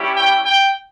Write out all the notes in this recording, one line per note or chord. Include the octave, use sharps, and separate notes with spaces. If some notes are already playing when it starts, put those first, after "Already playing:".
Already playing: G3 C#4 E4 G4
G5
G5